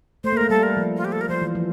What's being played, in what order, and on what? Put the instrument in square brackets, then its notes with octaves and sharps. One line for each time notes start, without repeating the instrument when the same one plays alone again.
[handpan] A3 [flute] C5
[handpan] A#3
[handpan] A3 [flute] A#4
[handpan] G3 [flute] A4
[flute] A#4
[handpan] F3
[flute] F4
G4
A4
A#4
[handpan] F3 [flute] C5
[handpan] E3
F3